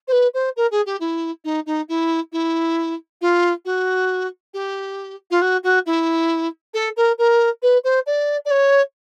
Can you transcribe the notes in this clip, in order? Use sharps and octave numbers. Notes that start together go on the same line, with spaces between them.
C5
B4
C5
A#4
G#4
G4
E4
D#4
D#4
E4
E4
F4
F#4
G4
F4
F#4
F#4
E4
A4
A#4
A#4
B4
C5
D5
D5
C#5